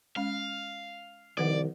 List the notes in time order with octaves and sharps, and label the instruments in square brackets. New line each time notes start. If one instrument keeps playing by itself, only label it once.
[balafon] G#3 C#4 [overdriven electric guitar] F5
[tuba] C2 [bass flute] D#3 [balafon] F3 B4 F#5 [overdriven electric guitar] D5